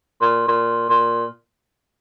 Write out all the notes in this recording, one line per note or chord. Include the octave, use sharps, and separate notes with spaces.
A#2
A#2
A#2